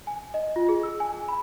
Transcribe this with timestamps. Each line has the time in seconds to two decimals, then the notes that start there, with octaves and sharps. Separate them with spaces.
0.07 G#5
0.34 D#5
0.56 F4
0.69 G#4
0.83 E6
1.00 G#5
1.13 G#5
1.28 B5